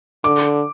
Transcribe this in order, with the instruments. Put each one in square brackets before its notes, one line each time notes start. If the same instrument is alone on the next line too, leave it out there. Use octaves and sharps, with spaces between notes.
[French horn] D3 [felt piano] D6